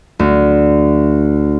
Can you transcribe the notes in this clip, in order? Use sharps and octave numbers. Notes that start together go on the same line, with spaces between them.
D2